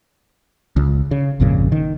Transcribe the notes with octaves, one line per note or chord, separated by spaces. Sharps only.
C#2
C#3
G#1 F2 A#2 C#3
D#3